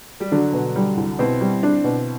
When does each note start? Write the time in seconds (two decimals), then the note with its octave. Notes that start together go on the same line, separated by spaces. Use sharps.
0.20 G3
0.32 D3 F#3 D4
0.53 B2
0.76 G3
0.97 C2
1.19 B2 C4 E4
1.41 G3
1.63 D4
1.84 B2